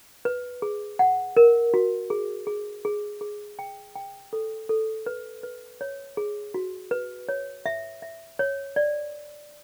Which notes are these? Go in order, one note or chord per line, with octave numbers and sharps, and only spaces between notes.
B4
G#4
F#5
A#4
F#4
G#4
G#4
G#4
G#4
G5
G5
A4
A4
B4
B4
C#5
G#4
F#4
B4
C#5
E5
E5
C#5
D5